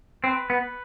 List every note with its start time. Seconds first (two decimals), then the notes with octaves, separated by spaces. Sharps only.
0.24 C4 B4
0.50 B3